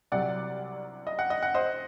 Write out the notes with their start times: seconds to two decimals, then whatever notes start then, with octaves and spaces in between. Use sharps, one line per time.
0.12 C2 C3 F#3 D5 F#5
1.07 D#5
1.19 F#5
1.30 D#5
1.43 F#5
1.54 C5 D#5